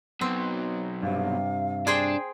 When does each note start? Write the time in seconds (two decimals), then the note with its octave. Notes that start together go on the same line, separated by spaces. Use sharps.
0.21 B2 F#3 C4
1.02 G2 C3 F5
1.87 D4 G#4 C5 G5